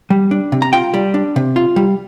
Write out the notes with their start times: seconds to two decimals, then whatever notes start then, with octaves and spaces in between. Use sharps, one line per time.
0.10 G3
0.31 D4
0.52 C3
0.62 A#5
0.73 F4 G5
0.94 G3
1.14 D4
1.36 C3
1.56 F4
1.76 G3